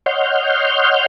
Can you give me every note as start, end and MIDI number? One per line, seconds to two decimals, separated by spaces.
0.06 1.06 73
0.06 1.06 75
0.06 1.06 78
0.06 1.06 84
0.06 1.06 89
0.06 1.06 91